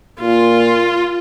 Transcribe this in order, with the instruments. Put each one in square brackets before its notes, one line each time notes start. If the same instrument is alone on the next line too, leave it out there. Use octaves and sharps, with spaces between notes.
[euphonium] A#2 [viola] F4